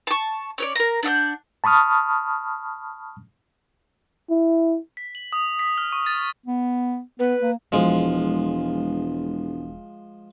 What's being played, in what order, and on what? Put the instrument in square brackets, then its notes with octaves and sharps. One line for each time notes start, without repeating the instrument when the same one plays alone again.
[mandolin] A5 C#6
C#4 C#5 D5
A#4 A#5
D4 F#5 E6 G6
[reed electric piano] A5 B5 C#6 D#6 F6
[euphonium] E4
[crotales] B6
F#7
D#6
B6
F6
C#6
A6
[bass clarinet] B3
[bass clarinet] B3 [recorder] B4
[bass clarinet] A#3
[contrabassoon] E1 [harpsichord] F3 G#3